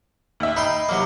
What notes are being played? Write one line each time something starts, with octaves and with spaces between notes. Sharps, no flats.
D#2 E5
D#4 G5 B5 C6
C3 F#3 A#3